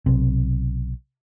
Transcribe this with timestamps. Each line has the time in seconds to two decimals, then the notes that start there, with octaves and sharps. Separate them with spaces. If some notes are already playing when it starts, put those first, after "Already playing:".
0.06 B1 C3